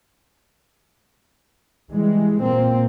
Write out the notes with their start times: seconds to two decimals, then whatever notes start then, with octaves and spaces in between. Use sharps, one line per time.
1.89 E3 G3 G#3
2.42 A#2 A#3 C4